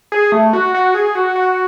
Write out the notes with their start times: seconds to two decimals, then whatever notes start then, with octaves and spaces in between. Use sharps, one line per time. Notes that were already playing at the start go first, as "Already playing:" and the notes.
0.12 G#4
0.32 A3
0.53 F#4
0.74 F#4
0.94 G#4
1.15 F#4
1.36 F#4